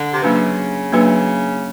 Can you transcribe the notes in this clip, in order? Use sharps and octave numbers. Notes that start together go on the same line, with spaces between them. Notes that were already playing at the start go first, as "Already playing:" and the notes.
Already playing: D3
C3
C#3 F#3 A#3 D4 F#4 B4
F#3 A#3 D4 F#4 B4